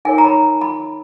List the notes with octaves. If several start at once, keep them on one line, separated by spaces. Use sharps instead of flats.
D#4 A#4 C#5 G#5
A#5
B5
B5